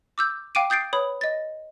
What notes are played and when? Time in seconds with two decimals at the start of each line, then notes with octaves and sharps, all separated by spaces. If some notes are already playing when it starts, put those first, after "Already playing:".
0.18 D6 E6 G6
0.55 F5 G5 D6 D7 D#7
0.70 D#6 G6 A6 C7 D7
0.93 B4 C#5 B5 D#6
1.21 D#5 A6